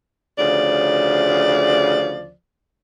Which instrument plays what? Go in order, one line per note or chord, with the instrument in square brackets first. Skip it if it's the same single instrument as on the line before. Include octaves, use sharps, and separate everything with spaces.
[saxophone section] D2 C#3 F3 D5